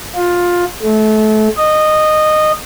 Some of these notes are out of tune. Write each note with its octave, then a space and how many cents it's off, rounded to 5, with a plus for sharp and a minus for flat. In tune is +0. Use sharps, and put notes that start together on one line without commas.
F4 +15
A3 -30
D#5 -15